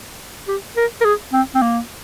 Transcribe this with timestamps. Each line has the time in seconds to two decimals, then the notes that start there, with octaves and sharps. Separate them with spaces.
0.48 G4
0.77 A#4
1.01 A#4
1.05 G#4
1.33 C4
1.55 C4
1.62 A#3